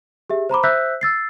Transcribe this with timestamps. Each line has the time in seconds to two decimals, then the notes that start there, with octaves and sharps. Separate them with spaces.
0.30 G4 G#4 E5
0.49 C5 A#5 B5 D6
0.63 C5 E5 E6 F#6 G6 B6
1.01 E6 A6 C7